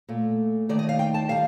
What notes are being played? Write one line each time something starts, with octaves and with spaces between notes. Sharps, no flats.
A#2 A3
D#2 D#3 A3 D5
D#5
F5
G5
A5
D#3 G3 F5